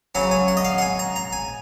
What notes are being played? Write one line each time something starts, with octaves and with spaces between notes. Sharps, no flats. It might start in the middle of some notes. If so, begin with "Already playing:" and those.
C#3 F#3 C#4 G#5
G#5
F#5
D#5
F5
F#5
G#5
A#5
A#5
G#5